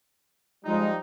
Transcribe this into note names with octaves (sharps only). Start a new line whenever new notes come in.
F3 G3 G#3 D#4